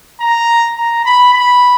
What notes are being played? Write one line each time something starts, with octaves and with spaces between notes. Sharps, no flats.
A#5
A#5
B5
B5